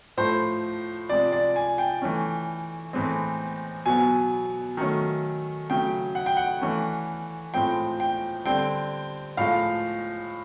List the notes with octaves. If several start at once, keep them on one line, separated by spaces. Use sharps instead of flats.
A2 F3 A3 C5
C3 F3 G#3 D5
D5
G#5
G5
E3 A3 C#4
A2 E3 G#3 C4
B2 F#3 B3 G#5
D#3 F#3 A3 C#4
C#3 F#3 A3 G5
F#5
G5
F#5
E3 A3 C#4
A2 F3 G#3 C4 G5
G5
D3 G3 C4 G5
A2 F3 G#3 F5